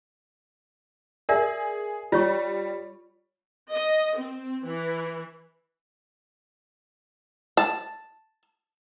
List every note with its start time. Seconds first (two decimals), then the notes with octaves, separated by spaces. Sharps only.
1.29 G#4 A#4 D5 E5
2.12 G3 F4 C#5 C#6
3.72 D#5
4.18 C4
4.66 E3
7.57 A5